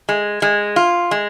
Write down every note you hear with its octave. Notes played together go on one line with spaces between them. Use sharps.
G#3
G#3
F4
G#3